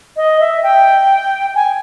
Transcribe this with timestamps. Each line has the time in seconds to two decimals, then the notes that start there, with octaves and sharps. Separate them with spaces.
0.17 D#5
0.40 E5
0.63 G5
1.55 G#5